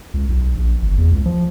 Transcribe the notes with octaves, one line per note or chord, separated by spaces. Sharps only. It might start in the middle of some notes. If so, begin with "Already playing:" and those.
C#2
B1
A#1
G1
E2
C#2
F3